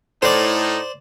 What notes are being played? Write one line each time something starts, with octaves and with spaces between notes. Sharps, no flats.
A2 D#4 C5 D5